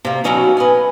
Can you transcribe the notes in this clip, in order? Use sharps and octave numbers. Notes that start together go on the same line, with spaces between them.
C3 A#3
B2 E3 F#3 C#4 D#4 F#4
B4 D#5 G#5